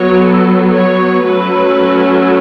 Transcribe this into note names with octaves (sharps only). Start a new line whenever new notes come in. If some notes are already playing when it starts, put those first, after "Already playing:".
Already playing: F#3 B3 C#5
A4
C#5
F#3 A3 C#4 B4